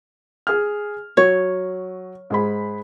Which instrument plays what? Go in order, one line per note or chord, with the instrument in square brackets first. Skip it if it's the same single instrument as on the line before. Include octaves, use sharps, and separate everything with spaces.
[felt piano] G#4 F6
[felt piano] F#3 [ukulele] C#5
[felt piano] G#2 G#4 B5